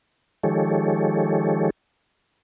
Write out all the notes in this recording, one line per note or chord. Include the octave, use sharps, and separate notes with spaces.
D#3 F3 G#3 G4 A4 C#5